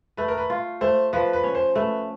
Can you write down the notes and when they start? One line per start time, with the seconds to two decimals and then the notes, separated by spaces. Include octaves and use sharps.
0.17 A3 B4
0.28 A#4
0.38 B4
0.50 F4
0.81 A3 C5
1.13 F3 B4
1.33 B4
1.44 C#4
1.55 C5
1.75 A3 B4